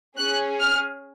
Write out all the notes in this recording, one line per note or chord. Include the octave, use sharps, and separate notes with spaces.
C#4 G#4 F#6
F6